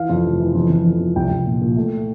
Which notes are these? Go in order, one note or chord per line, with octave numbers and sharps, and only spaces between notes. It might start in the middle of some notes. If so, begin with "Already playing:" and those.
Already playing: E3 F5
F2
F1
E3
F2
F2
F2
F2
C2 G5
C2
A#2
A#2
A3